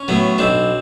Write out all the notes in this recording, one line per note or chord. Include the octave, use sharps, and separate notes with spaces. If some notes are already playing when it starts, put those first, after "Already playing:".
Already playing: C#4
A2 F#3 B3
B1 C4 D4